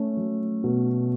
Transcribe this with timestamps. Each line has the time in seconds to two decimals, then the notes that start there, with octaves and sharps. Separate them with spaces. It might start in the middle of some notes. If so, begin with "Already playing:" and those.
Already playing: A3 C#4
0.17 F#3
0.64 B2